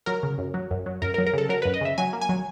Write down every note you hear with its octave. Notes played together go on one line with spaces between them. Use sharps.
F#3 A#4
C#3
F#2
F#3
F#2
F#3
F#2 A#4
A#4
F#3
A#4
C#3 A4
F#3 A#4
B4
F#2
D#5
C#3 E5
F#3 G#5
A#3
G#5
F#3